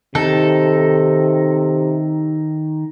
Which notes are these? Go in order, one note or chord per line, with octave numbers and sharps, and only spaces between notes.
C3 D#3 D#4 A4